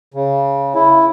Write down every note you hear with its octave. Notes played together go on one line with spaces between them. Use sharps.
C#3
E4